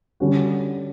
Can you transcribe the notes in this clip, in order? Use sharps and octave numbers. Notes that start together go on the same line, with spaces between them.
D3 G3 C#4 F#4